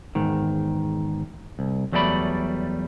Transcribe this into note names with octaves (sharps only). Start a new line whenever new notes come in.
E2 G#2 D#3
C2
E2 F#3 G3 A3 D5 B5